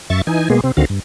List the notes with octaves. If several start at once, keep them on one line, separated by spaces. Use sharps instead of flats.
F#2 E5 C#6 A6
E3 D#4 G#5
B2 G#3 A#3 B3 G#4
C3 C4
D2 D3 D#3 C4 F#4 F5
G2